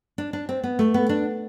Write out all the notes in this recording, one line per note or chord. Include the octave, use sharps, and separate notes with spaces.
D4
D4
C4
B3
A3
B3
D4